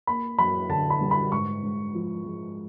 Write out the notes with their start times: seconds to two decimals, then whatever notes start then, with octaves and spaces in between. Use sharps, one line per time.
0.07 A#3 B5
0.38 F#2 B5
0.69 D3 A5
0.90 B5
1.01 G3
1.11 B5
1.32 G#2 C#6
1.63 G#2
1.94 F3
2.25 G#3